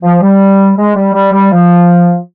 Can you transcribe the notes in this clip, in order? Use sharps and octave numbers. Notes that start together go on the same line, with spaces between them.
F3
G3
G#3
G3
G3
G3
F3